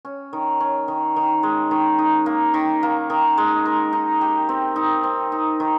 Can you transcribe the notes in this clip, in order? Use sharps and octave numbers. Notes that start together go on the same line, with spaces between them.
C#4
D#3
C#4
D#3
D#3
G#3
D#3
D#4
A#3
D#3
A#3
D#3
G#3
A#4
D#4
G4
C4
D#4
C4
D#4
D#3